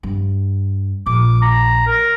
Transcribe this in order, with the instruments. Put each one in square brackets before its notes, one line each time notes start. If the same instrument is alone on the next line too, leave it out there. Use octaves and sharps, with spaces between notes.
[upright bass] G2
[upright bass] A#1 [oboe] D6
[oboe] A#5
A#4